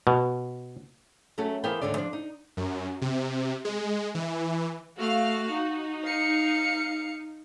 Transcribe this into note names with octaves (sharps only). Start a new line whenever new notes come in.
B2
F#3 A3 C#4 F#4 A4
E3 B3 A#4 C5 F5 G5
D2 G#2 D3 C#5 D5
F3 D4
D#4
F#2
C3
G#3
E3
A3 F#4 F5
D#4
F5 C#7